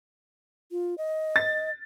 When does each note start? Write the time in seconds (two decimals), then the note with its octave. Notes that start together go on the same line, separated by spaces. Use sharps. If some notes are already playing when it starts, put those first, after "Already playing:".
0.72 F4
0.98 D#5
1.36 A6